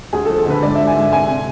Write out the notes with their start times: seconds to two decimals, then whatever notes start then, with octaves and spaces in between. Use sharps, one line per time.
0.13 D2 G#4
0.25 A4
0.30 F3
0.38 A4
0.46 D3 B4
0.63 G#2 D5
0.75 E5
0.79 G#2
0.87 G#5
0.96 G#2
1.13 C3 G#5
1.29 C3